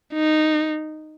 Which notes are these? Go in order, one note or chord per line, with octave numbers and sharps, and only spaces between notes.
D#4